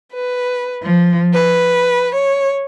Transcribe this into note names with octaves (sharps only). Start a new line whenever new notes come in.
B4
F3
B4
C#5